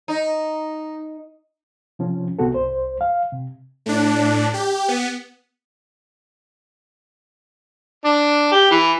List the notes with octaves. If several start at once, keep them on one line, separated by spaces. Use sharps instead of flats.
D#4
C3 F3 C#4 F4
C2 C3 B3 F#4 A4
C2 C5
F5
C3
A2 D4
G4
B3
D4
G4
E3